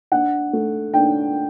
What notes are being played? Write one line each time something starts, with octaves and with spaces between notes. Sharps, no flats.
D4 F#5
A3
D4 G5